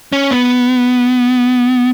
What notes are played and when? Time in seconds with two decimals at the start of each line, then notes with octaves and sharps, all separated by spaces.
0.12 C#4
0.31 B3